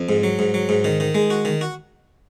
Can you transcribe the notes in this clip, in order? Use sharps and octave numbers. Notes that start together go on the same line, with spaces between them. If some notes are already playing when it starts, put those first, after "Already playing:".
Already playing: F2
G#2
F#3
G#2
F#3
G#2
D#3
D#3
G#3
F#4
D#3
F#4